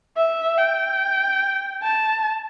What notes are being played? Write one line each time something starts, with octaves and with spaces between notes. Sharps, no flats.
E5
G5
A5